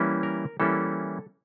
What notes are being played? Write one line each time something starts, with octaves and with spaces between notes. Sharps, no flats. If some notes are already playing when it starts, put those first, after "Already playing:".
Already playing: E3 G3 A#3 C#4 E4
A#4
E3 G3 A#3 C#4 E4 A4